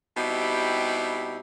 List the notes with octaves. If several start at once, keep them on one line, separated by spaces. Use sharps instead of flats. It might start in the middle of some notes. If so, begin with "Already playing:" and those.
B2 G3 C4 D#4 E4 G4